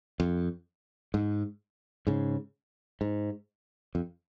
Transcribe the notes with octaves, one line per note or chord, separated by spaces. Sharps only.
F2
G#2
G#2 C#3
G#2
F2